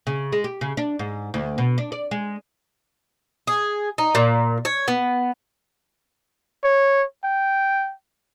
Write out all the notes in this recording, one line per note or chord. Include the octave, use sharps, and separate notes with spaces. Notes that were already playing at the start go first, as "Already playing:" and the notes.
C#3
G#3
G4
C#3
D4
G#2
D2
B2
D4
D5
G#3
G#4
D#4
A#2
C#5
B3
C#5
G5